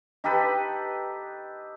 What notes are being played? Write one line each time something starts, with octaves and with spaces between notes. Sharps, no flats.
D#4 G4 A4 B4